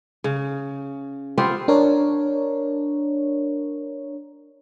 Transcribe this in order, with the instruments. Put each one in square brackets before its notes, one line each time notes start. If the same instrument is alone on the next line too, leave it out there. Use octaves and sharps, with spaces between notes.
[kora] C#3
B3 C4 F4 G4
[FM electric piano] D4 A#4 C#5